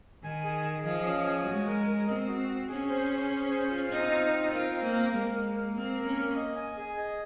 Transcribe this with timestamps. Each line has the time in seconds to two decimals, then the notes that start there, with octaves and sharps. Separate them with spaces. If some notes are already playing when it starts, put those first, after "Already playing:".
0.23 D#3 G#5
0.44 G#4
0.64 G#4
0.85 F3 D#5
1.05 C#4
1.26 G#5
1.46 G#3 F#4
1.67 A#4
1.87 A#4
2.07 C4 D#5
2.28 F#4
2.48 F#4
2.69 C#4 G#4
2.89 C5
3.09 G#4
3.30 G#4
3.51 C5
3.70 F4
3.90 C4 D#4
4.12 F4
4.32 C4
4.51 F4 A#4
4.72 C4
4.82 A#3
4.93 A#4
5.13 G#3 A#3
5.33 A#3
5.54 A#3
5.74 A#3 C4
5.94 A#4
6.05 C#4
6.15 A#3
6.35 D#5
6.56 G#5
6.77 G#4
6.97 D#5